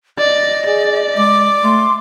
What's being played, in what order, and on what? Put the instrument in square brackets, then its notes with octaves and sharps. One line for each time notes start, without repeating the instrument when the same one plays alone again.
[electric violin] D5 [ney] D#5
[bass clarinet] G#4 [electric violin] D5
[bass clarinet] G#3 [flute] D6
[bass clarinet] A3 [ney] C6